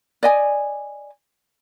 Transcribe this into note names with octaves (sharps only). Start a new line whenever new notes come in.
D5 D#5 G#5